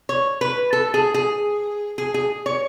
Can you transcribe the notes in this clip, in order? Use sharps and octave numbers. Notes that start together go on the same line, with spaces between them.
C#5
B4
A4
G#4
G#4
G#4
G#4
C#5